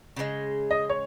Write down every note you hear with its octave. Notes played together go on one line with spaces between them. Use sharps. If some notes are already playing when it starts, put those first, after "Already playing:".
C#3 F3 G#3
D#5
C#5